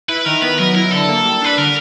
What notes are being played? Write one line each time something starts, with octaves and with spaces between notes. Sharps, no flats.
E4 B4
D#3 A#4
B3 B4
F#3 A#4
E4 A#4
D3 A4
A#3
G3
D4 B4
D3 A#4